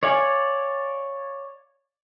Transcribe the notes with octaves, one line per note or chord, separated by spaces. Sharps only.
C#5 D5 F5 G#5